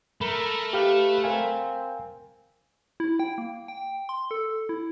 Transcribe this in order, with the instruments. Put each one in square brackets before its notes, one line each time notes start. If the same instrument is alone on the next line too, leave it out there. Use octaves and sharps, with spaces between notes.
[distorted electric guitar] A3 [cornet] A#4 [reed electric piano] B5
[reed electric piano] G4 F5 F6 [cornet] B4
[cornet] C4 [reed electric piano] A#4 F5 G#5
[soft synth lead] E4
G5
A#3
G5
C6
A4
E4